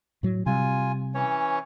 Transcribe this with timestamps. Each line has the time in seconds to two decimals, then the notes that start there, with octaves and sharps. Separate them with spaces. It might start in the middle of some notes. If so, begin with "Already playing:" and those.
0.23 A2 F#3
0.46 C3 G3 F4 G#5
1.15 E3 C#4 C#5